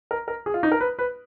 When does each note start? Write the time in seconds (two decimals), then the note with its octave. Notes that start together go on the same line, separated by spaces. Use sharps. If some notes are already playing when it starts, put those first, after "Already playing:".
0.11 A#4
0.28 A#4
0.46 G#4
0.54 F4
0.63 D#4
0.72 A#4
0.80 B4
0.99 B4